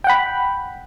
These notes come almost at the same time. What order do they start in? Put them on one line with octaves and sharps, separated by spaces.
G5 F#5 B5